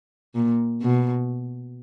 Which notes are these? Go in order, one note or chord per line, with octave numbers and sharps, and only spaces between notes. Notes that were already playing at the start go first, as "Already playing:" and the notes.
A#2
B2